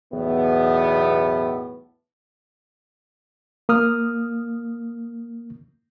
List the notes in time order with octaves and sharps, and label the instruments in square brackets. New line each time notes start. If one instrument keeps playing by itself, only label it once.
[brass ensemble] B1 E2 A2 B3
[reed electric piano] A#3 D#6 F6